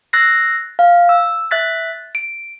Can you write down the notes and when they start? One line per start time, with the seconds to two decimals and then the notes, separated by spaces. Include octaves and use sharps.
0.13 E6 F#6 A6 A#6 C7
0.79 F5
1.09 E6
1.51 E5 F#6 A6 B6
2.15 D7